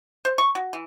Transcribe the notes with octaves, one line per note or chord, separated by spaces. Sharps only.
C5
C#6
F#4
E3